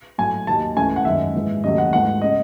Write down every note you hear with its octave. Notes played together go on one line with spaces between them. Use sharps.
A2 F#3 A3 G#5
D#2 D#3 F#3 A5
C#2 C#3 E3 A3 G#5
F#5
F#2 D#3 G#3 E5
G#2 E3 G#3
D#2 C#3 F#3 A3 D#5
F#5
G#2 E3 A3 F#5
C#3 G#3 D#5